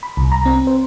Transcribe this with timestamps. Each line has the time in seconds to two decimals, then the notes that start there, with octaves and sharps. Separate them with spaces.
0.03 B5
0.17 C2
0.32 A#5
0.46 C4
0.67 C5